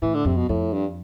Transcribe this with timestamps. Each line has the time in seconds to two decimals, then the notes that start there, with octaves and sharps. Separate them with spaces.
0.02 A2 E3
0.14 D3
0.25 F2 C3
0.37 B2
0.49 F2 A2
0.73 G2